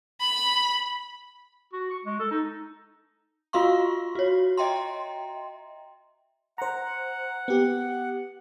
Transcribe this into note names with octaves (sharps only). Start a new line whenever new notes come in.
B5
F#4
C#6
G#3
A4
D#4
F4 F#4 F5 C6 C#6
F#4 C#5
D#5 E5 G5 A#5 C6
C5 F#5 A#5
B3 G4